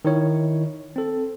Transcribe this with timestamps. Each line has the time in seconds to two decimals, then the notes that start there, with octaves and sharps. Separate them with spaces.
0.05 D#3 E4 C#5
0.96 C4 A4